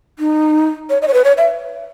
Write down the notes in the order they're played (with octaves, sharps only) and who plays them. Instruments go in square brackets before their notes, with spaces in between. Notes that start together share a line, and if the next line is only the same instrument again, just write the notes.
[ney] D#4
C#5
D#5
C#5
B4
C#5
E5